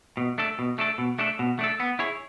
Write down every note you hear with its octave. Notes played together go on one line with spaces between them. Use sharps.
B2
A3 D4 A4
B2
A3 D4 A4
B2
A3 D4 A4
B2
A3 D4 A4
B3
E4 G#4 C#5